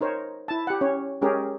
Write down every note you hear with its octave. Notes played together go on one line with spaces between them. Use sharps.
D#4 A#4 C5 C#5
E4 A5
G4 F#5
C#4 C#5
G#3 C#4 G4 G#4 A#4